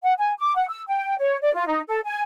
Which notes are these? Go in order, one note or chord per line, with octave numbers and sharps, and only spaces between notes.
F#5
G#5
D6
F#5
E6
G5
C#5
D5
F4
D#4
A4
G#5